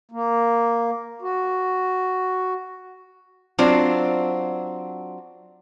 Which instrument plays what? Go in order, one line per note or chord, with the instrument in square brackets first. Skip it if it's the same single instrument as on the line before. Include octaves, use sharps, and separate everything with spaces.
[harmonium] A#3
F#4
[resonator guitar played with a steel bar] F#3 C4 D4 F4 C5